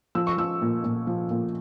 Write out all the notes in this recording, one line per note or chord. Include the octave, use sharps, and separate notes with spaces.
F3 E6
C#6
F3 E6
A#2
A#2
F3
A#2